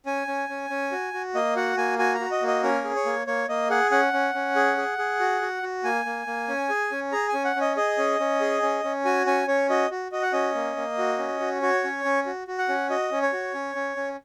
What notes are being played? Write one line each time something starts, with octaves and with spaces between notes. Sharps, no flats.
C#4 G#5
C#4
C#4
C#4
F#4
F#4
A#3 D#5
F#4 F#5
A#3 G#5
F#4 G#5
A#5
F#4
D#5
A#3
D#5
C#4 A#4
G#4
C#5
A#3
A#3 C#5
A#3 D#5
G#4 F#5
C#4 F#5
C#4
C#4
G#4
G#4
G#4
F#4
F#4
F#4
A#3 G#5
A#3
A#3
C#4
G#4
C#4
G#4 A#5
G#5
C#4
F#5
C#4
D#5
G#4 D#5
C#4
C#4
G#4
C#4
C#4
F#4 G#5
C#4 G#5
C#4 C#5
F#4 D#5
F#4
F#4 D#5
F#5
C#4 D#5
A#3
A#3
F#4
C#4
F#4
F#4 C#5
C#4
C#4
F#4
F#4
F#5
C#4
F#4 D#5
C#4
C#5
F#4
C#4
C#4
C#4